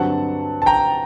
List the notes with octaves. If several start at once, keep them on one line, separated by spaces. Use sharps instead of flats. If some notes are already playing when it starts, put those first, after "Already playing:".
Already playing: G2 D3 F#3 C4 F#5 A5
A5
G5 A#5